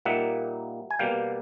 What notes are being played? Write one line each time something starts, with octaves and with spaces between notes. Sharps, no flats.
A#2 G3 A#3 D#4 E5 F#5
G#5
B2 G3 A#3 F5 G5